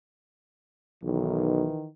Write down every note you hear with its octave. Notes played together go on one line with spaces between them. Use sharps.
B1 D#3 E3